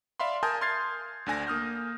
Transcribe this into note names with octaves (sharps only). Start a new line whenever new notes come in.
D5 E5 F5 B5 C6
A#4 G#5 A5 D#6 G6
C6 F6 G#6 A6 C7
D2 D3 G#5 A#6
A#3 D#6 F6 G6